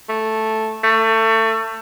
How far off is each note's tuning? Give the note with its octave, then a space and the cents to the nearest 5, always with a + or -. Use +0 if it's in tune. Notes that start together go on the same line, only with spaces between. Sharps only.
A3 +0
A3 +25